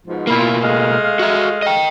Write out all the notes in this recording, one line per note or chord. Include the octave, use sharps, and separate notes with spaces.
G#2 B2 F3
B2 A#3 E4 F4
G#3 A3 F5
F#4 E5
D#5 G5